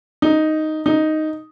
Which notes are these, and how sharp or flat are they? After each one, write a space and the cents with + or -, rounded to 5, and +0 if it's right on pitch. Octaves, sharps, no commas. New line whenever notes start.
D#4 +0
D#4 +0